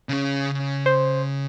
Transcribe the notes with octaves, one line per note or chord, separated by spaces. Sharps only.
C#3 C#4
C5